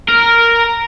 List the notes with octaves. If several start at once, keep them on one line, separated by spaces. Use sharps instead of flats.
A#4